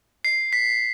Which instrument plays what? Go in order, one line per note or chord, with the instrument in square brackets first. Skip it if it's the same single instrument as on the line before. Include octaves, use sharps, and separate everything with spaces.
[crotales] C7
B6